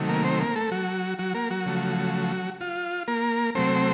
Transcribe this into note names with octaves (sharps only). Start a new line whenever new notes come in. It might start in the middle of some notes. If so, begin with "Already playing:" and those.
Already playing: C3 D#3 F#3 A3
A#3 A#4
C4 C5
A#3 A#4
A3 A4
F#3 F#4
F#3 F#4
A#3 A#4
F#3 F#4
C#3 F3 A3
F4
A#3 A#4
C3 F#3 A3 C4 C5